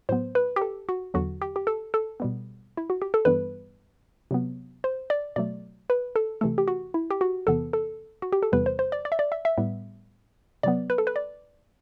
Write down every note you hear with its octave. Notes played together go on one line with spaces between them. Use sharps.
A2 F#3 B3 C5
B4
G4
A4
F#4
E2 D3 F#3 F#4
G4
G4
A4
A4
B2 G3 B3
E4
F#4
G4
A4
G2 E3 G3 B3 B4
C3 F#3 B3
C5
D5
B2 F#3 A3 D5
B4
A4
C3 E3 A3 A4
G4
F#4
E4
G4
F#4
E2 C3 E3 B3 A4
A4
F#4
G4
A4
E2 C3 E3 G3 B3 B4
C5
C5
D5
D5
E5
D5
E5
E5
A2 G3 B3
C3 F#3 B3 D5
B4
A4
B4
D5